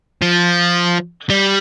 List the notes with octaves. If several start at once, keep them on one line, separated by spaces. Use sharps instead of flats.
F3
G3